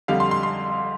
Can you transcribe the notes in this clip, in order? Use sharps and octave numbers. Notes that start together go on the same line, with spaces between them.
F2 D3 G3 F5
C6
C6
C6